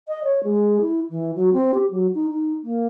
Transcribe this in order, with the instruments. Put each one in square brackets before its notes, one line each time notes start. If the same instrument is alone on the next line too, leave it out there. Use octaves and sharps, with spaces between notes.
[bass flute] D#5
C#5
G#3
E4
E3
F#3
C4
G4
F#3
D#4
D#4
A#3